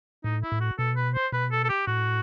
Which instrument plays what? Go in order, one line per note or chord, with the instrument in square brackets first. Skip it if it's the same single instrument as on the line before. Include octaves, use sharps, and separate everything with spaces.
[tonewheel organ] A2 [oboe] D#4
[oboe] E4
[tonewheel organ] A2
[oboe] F#4
[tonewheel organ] B2 [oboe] A4
[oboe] B4
C5
[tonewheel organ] B2 [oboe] B4
[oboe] A4
A4
G4
[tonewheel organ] A2 [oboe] F#4